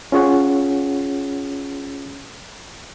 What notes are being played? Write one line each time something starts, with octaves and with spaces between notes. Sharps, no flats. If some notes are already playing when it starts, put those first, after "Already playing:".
C#4 F4 G#4 C#5 F#5